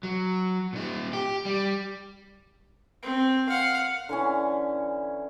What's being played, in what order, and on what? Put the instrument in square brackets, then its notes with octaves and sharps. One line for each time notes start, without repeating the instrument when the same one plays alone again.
[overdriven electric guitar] F#3
A#2 D#4
G4
G3
[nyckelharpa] C4
F5 F#5
[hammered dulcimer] D3 E3 C#4